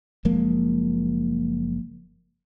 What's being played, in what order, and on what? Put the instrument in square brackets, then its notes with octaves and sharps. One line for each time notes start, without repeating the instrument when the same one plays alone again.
[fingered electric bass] F#1 F3 G#3 A#3